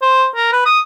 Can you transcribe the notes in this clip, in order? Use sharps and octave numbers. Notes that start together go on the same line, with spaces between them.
C5
A#4
B4
D#6